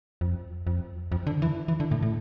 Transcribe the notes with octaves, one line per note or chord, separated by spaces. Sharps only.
F2
F2
F2
D3
E3
E3
D3
A2
A2